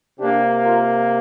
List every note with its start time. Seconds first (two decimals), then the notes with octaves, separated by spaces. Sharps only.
0.19 C3 A#3 D4 G4
0.64 F4 A#4